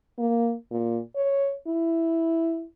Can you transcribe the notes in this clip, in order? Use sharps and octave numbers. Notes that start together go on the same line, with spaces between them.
A#3
A#2
C#5
E4